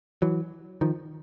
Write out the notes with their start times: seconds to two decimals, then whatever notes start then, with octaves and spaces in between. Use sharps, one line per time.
0.22 E3 F#3
0.81 D#3 F3